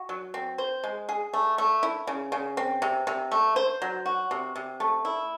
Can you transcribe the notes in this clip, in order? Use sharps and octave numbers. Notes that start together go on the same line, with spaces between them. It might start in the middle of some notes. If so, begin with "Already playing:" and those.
Already playing: F#4
F#3
C4
C5
G#3
G#4
A3
A3
E4
C#3
C#3
C4
C3
C3
A3
C5
F#3
F#4
C3
C3
A3
E4